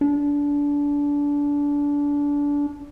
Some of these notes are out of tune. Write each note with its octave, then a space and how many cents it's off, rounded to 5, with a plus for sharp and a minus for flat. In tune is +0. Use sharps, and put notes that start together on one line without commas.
D4 -25